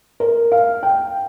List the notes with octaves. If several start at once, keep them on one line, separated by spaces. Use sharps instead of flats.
A#4
F5
G5